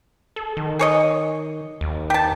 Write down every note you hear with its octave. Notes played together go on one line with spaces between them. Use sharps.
A4
D#3
G#4 C#5 D#5
D#2
G4 A5